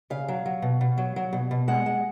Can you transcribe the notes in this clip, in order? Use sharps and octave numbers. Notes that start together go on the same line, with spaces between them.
C#3 F5
F#3
F#3
B2
B2
F#3
F#3
B2
B2
G#3 F#5
G#3